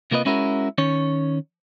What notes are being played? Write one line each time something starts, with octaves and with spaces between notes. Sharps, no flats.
C3 A#3 F4 B4 D#5
G#3 C#4 E4 F#4 A#4
D#3 C#4 C#5